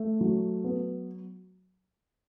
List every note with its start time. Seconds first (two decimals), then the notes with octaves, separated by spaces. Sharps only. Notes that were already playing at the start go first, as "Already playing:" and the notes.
Already playing: A3
0.21 F#3
0.64 B3